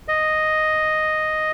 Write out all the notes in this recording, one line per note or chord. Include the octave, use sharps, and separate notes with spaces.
D#5